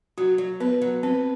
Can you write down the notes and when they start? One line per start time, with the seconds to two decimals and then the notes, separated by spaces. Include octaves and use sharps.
0.18 F#3 F#4
0.38 F#3
0.60 B3 B4
0.82 F#3
1.03 C4 B4